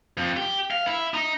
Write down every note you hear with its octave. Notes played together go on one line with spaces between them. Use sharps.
F2
G4
F5
E4
D#4